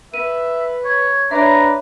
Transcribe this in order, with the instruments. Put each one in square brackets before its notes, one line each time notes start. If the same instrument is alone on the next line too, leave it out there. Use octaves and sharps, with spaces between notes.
[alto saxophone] B4 [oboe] E5 [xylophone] D#7
[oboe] C#5
[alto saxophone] D4 [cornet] B4 [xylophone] C#5 E5 [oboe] A#5